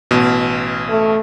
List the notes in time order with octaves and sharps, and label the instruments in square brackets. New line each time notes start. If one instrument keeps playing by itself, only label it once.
[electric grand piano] A1 B2
[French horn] A3